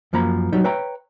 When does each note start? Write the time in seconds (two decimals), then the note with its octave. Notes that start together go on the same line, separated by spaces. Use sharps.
0.13 F#2 F3 A#3 A#5 B5
0.52 F#3 G3 D#4
0.64 B4 C#5 E5 G5 A#5